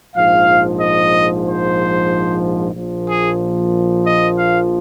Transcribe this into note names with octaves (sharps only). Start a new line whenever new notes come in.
A#1 G#2 F3 F5
D#5
C5
A#1 A#2 F3
G#4
D#5
F5